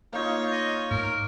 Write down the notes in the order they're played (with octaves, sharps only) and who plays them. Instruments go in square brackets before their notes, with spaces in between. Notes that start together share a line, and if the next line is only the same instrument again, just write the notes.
[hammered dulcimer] A#3 D#4 [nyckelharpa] F4 C#5
[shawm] D#5
[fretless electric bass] G#2 A3 [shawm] A#4